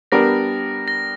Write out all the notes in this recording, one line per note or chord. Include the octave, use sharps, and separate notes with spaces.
G3 B3 D4 G4 A#4 A#6
A#6